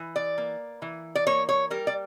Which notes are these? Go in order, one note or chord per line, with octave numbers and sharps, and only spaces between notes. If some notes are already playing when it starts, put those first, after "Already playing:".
Already playing: E3
D5
A#3
E3
D5
A#3 C#5
C#5
G3 A#4
D5